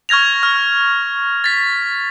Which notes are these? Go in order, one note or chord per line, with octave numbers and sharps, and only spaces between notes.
C#6 F6 G#6 A#6 F7
F6
A6 B6